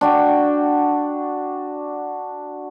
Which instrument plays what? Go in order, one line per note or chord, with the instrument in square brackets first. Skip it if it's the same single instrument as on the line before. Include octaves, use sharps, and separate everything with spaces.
[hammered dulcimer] D4 F#4 G5